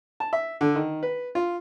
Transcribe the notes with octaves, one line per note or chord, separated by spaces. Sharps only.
A5
E5
D3
D#3
B4
F4